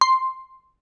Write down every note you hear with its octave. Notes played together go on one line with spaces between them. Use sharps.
C6